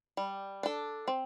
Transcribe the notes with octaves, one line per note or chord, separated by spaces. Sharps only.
G3
D4 A4
C4